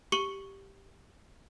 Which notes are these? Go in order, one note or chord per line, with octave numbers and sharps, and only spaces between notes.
G4 C#6 C#7 F#7 G7